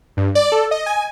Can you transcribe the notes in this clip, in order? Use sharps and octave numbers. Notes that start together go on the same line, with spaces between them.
G2
D5
A4
D#5
G#5